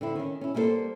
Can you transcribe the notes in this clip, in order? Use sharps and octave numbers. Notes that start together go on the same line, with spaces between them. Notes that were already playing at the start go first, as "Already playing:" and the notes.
D3 C4 E4
D#3 C#4
C#4 E4
G3 A#3 E4 F#4 A4 C5